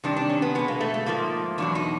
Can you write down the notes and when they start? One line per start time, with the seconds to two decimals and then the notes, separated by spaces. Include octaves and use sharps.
0.04 C3 D#3 G3 D4
0.16 D4
0.29 C#4
0.42 B3
0.55 B2 G#3 B3
0.68 A#3
0.81 A3
0.94 A3
1.06 G#2 F3 A3 A#3
1.58 E2 B2 F#3 D4
1.75 D#4